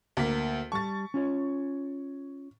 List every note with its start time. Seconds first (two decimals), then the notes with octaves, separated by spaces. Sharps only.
0.17 D2 A#3 B6
0.72 G3 A5 C#6 A6
1.14 C#4 F4 C#5